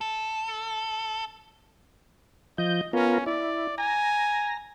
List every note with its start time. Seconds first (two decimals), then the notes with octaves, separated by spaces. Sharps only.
0.01 A4
2.58 F3 D#5 G6
2.93 B3 C#4 F4 A#4
3.27 E4 D5
3.78 G#5 A#5